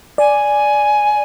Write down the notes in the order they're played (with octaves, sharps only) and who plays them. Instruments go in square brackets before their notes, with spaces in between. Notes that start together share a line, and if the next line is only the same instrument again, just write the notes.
[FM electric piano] D5 [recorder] G#5